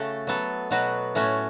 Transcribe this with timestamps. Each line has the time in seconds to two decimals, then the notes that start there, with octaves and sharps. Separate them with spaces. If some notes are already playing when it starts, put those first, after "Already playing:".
Already playing: C#3 A3 F#4 A4
0.27 F#3 B3 A4
0.71 B2 F#3 B3 F#4
1.15 A2 A3 C#4 F#4